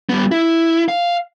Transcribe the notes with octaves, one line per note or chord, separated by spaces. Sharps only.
G3 B3
E4
F5